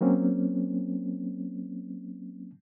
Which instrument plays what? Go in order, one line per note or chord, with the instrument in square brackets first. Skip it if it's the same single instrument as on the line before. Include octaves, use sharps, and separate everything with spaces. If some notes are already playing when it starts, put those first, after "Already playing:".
[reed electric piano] F#3 A#3 C4 C#4